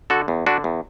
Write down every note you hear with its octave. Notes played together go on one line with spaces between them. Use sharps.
D3 F#4 A4
E2
D3 D4 F#4
E2